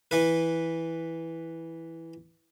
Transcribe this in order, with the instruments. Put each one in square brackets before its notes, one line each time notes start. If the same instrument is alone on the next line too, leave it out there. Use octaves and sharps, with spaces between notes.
[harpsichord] E3 B4